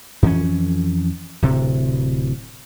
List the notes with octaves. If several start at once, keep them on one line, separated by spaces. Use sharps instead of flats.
F2 E3 C#4
D1 C3